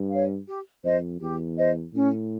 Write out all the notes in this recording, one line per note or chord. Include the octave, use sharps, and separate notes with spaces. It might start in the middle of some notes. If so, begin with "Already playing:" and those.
Already playing: G2
C#5 F5
G4
F2 C5 D#5
E2 G4
C5 D#5
A2 C#4